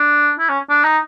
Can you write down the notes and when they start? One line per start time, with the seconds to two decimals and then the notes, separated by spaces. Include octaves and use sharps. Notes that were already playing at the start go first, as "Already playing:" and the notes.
Already playing: D4
0.39 E4
0.49 C#4
0.69 D4
0.84 D#4